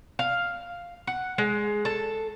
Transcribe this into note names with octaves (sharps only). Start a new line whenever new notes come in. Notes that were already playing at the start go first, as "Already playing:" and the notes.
F5
F#5
G#3
A4